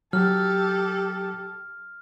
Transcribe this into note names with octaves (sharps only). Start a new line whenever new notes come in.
F#3 G4 A4 F6